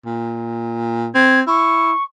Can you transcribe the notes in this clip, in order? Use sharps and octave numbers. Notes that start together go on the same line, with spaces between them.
A#2
C4 G#6
E4 C#6